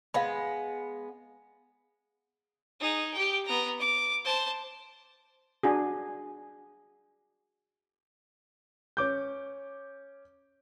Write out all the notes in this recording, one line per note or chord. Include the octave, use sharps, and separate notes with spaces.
G#3 B3 F5 B5
D#4 G#4
G4 G5
B3 A#5
D6
C5 A5
D4 F#4 G#4
C#4 D6 G6